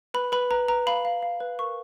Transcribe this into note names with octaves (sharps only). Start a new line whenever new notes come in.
B4 B5
B4 B5
B4 A#5
B4 A#5
F5 B5
F5
F5
B4
A#4 C#6